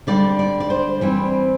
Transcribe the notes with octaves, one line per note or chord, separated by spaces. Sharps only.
D3 G3 D4 D5
D5
D5
C5
E3 G3 C4